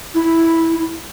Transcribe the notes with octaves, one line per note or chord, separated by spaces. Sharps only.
E4